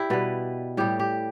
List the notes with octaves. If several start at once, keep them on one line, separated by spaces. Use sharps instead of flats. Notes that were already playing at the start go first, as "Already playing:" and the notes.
Already playing: E4 G4 D5
B2 G3 B4
A2 G3 G4
G4